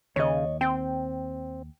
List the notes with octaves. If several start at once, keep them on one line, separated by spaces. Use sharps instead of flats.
D#2 C#3 C#5 D#5
C4 G5